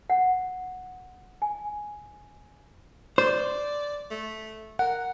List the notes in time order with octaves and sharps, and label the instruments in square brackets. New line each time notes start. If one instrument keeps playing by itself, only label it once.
[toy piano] F#5
G#5
[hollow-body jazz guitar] C5 [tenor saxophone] D5
[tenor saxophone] A3
[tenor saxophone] A#4 [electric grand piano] F#5